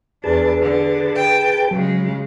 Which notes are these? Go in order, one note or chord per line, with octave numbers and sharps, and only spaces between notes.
E2 D4 G#4 B4 A5
D3
G5
C#3 F#3 G#3